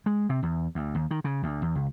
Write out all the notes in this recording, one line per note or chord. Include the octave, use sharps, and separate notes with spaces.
G#3
C3
E2
D2
D#2
D#3
C#3
D2
E2
C#2